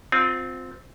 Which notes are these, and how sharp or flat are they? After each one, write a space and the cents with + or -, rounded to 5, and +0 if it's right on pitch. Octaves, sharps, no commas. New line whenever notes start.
C4 -10 F4 +30